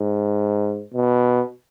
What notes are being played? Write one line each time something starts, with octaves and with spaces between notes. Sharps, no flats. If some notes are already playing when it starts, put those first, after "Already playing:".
Already playing: G#2
B2